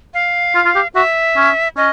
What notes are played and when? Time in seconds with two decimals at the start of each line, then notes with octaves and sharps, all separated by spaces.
0.14 F5
0.55 F4
0.65 F4
0.75 G4
0.95 F#4 E5
1.37 C#4
1.77 C#4 D#5